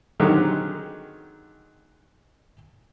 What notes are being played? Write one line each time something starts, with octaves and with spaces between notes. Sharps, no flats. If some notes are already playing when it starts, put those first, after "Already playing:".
D3 D#3 F#3 G#3 C4 G4